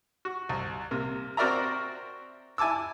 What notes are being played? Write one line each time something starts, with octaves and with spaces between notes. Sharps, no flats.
F#4
C2
C3 A#3
C4 F#4 A#4 D5 E5 A#5
E4 G#5 A5 D6 E6